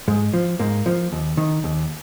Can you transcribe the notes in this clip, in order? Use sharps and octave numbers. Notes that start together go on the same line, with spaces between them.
G#2 G#3
F3
G#2 A#3
F3
D#2
D#3
D#2